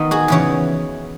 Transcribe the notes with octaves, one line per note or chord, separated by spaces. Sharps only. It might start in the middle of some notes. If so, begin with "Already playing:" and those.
Already playing: D#3 B3 D#4
F#4 G#4
E2 C#3 E3 B4 C#5